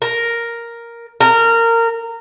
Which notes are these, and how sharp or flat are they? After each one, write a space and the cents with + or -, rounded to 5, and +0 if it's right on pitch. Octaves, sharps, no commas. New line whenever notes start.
A#4 +0
A#4 -20